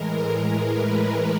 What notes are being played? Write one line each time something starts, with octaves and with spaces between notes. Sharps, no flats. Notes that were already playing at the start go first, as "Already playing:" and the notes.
Already playing: A2 E3 G#3 A#4
B4